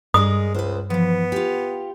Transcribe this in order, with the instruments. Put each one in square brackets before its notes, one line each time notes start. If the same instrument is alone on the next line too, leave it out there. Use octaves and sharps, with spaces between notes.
[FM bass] G2 [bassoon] G#3 [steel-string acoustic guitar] G#4 A#4 D5 [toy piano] D#6
[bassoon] C#2 [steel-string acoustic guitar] B4 C5
[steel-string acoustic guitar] E3 F3 [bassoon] B3
[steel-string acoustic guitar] F4 G4